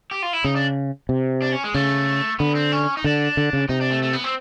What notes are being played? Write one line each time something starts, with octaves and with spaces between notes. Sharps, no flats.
G4
F4
E4
C#3 D#4
D4
C3
D4
C#4
G#3
C#3 A3
D3 B3
C4
C#4
D#4
D3 D4
D3
C#3
C3 D#4
D4
A3
A3
B3
C4